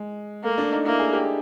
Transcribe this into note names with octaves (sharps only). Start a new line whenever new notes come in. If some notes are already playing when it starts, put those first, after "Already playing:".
Already playing: G#3
A3 A#3
D4
D#4
A#3 E4
G#4
G4